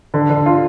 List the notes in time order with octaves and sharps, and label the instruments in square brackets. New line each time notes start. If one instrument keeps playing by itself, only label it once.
[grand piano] D3
D3
F4